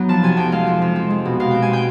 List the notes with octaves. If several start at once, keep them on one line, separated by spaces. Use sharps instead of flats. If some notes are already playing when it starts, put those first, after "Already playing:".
Already playing: F#3 B3 D#4
F3 A5
C3 G#5
F2 G5
G#3 F5
F3
C3
C4
G#3
B2
B2 F5
C4 G5
G#5
G#3 G5